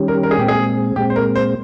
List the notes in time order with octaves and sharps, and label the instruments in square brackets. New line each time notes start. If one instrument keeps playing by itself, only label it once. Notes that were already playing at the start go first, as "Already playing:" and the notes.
Already playing: [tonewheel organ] D#3 G3 C#4 G4
[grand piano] A#4
A#4
G#4
[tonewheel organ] A#2 G#3 C4 [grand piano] G4
[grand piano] G#4
[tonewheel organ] A#2 G#3 C4 [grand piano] G4
[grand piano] C5
A#4
C5